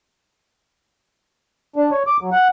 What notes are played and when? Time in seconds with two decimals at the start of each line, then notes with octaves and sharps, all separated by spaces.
1.76 D4
1.91 C#5
2.07 D6
2.21 F#3
2.33 F#5